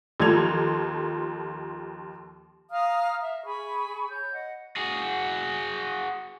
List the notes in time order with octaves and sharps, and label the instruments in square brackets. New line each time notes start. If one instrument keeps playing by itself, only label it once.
[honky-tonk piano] D#2 F3 A4 G#6 F7
[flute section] F5 A#5 D#6 F6
E5
G#4 B5 C#6
C#5 G6
D#5 F#5
[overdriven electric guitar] F#4 G#4